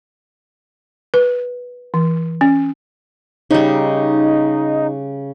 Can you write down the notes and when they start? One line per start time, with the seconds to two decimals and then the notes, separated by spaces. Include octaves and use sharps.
1.14 B4
1.94 E3
2.41 C#4
3.51 C#3 G3 D#4